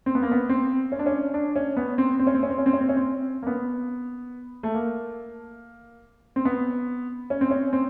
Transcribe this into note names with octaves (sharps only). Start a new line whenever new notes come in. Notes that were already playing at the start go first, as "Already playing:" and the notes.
C4
B3
A#3
B3
C4
C#4
D4
C#4
D4
C#4
B3
C4
C4
C#4
C4
C#4
C4
C#4
C4
C#4
C4
C#4
C4
A#3
B3
A3
A#3
C4
B3
C#4
C4
C#4
C4